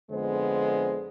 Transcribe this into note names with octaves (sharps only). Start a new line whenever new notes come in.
F2 D3 G#3 B3 C5